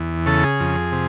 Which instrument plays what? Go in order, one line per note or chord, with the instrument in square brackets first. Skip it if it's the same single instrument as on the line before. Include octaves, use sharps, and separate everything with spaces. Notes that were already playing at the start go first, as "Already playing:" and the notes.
Already playing: [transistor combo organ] E2
C#3 A4
G#4
F2
C3